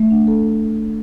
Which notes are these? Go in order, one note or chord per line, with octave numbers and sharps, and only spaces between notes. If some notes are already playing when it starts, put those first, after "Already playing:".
Already playing: A3
D4
A4